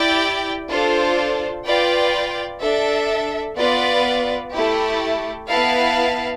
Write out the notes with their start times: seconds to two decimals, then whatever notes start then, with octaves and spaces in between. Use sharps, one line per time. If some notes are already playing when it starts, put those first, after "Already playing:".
Already playing: E4 G4 D5 G5
0.68 D4 F4 A4 C5
1.65 F4 B4 D5 G5
2.61 D4 A4 E5
3.58 B3 F4 B4 D5
4.53 A3 E4 G4
5.49 B3 E4 B4 F5 A5